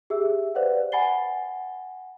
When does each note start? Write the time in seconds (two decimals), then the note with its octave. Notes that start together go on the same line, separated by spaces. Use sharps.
0.10 G4 G#4 E5 E6
0.55 B4 C5 D5 F5 F#5
0.92 F#5 G#5 B5 A6 C7 G7